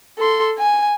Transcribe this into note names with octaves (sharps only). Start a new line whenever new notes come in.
A4 C6
G#5